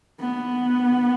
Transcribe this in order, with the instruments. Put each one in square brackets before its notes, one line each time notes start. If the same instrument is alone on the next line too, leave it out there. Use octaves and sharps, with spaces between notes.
[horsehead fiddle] B3